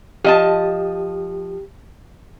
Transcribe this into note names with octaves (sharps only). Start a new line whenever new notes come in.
F3 G4 D#5 A5